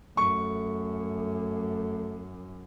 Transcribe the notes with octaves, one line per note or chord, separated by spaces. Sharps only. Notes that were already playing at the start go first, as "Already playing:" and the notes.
F#2 A3 C#6